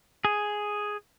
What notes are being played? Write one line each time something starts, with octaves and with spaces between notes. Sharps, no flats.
G#4